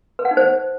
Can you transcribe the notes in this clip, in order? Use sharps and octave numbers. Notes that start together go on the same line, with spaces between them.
B4
F#5
D#4
C5